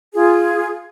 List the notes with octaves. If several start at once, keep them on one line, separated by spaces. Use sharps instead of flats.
F4 G#4